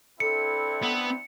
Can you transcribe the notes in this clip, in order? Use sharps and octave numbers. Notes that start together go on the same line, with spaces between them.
C4 D4 E4 A4 C#7
B3